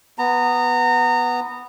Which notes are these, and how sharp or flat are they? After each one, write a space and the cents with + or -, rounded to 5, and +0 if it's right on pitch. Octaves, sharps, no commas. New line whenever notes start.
B3 +0 A#5 -25